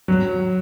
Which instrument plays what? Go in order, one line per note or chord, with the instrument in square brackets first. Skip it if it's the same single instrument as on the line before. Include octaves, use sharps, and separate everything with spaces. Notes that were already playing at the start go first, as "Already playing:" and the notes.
[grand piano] F#3